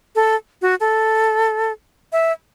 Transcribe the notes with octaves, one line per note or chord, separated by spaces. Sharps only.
A4
F#4
A4
E5